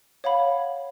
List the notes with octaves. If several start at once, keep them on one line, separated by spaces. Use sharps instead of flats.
C#5 F5 F#5 B5